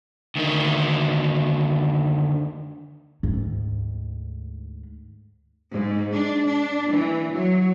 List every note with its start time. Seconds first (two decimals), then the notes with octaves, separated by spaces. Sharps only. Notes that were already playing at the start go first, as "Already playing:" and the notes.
0.36 D2 D#3
3.23 D2 G#2
5.71 G#2
6.14 D4
6.47 D4
6.92 E3
7.33 F#3